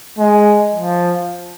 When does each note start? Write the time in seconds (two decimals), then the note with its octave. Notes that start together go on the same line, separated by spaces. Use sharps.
0.18 G#3
0.75 F3